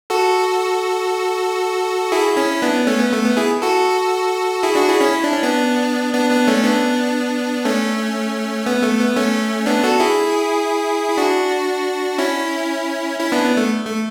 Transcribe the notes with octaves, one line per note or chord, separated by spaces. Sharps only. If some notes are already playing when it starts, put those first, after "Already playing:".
F#4 A4
E4 G#4
C#4 E4
B3 D4
B3
A3 C#4
B3
A3
B3
E4 G#4
F#4 A4
E4 G#4
D4 F#4
E4 G#4
C#4 E4
E4
D4
C#4
B3 D4
B3 D4
B3 D4
A3 C#4
B3 D4
A3 C#4
B3
A3
B3
A3 C#4
B3 D4
F#4 A4
E4 G#4
E4
D4 F#4
C#4 E4
C#4 E4
B3 D4
B3
A3
A3